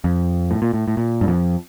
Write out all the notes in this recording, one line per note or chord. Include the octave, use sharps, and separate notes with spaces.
F2
A2
A#2
A2
A2
A#2
G2
F2